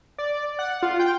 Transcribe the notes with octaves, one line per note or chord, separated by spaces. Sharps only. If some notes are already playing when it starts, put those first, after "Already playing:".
D5
F#5
F4
G5